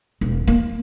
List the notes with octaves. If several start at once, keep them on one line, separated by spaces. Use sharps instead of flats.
E1
A#3